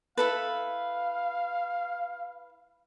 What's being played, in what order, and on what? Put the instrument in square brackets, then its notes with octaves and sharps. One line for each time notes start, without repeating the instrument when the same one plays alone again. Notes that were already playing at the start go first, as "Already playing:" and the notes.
[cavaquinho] E4 A4 B4 [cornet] F5